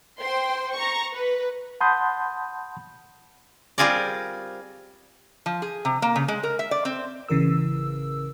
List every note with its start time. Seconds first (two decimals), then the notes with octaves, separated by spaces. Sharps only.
0.21 C5 G5 C6
0.74 A#5 C#6
1.14 B4
1.81 F#5 A5 B5 C6 D#6 G6
3.78 G3 C4 F4 G#4 A#4 D5
5.46 F3
5.62 G#4
5.85 C3
6.02 A#3
6.16 C#3
6.28 G#3
6.43 A#4
6.59 E5
6.71 D5
6.85 C4
7.29 A1 C#3 E3 A#4 E6